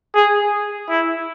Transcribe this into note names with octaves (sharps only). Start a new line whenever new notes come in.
G#4
E4